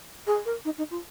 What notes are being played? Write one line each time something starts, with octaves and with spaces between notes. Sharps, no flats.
G#4
A#4
D#4
D#4
F4